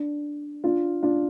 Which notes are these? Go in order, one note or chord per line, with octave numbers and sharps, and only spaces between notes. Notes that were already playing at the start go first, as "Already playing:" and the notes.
Already playing: D4
D4 F4
D4 F4